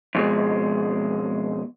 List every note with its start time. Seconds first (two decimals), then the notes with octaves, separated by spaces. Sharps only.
0.15 F2 B2 G#3